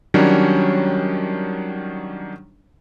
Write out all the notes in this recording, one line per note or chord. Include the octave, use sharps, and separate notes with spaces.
D#3 F#3 G3 C#4 D4 C#5